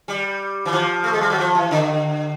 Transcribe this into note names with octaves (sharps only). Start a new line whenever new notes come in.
G3
E3
F3
A3
G#3
G3
F#3
F3
E3
D3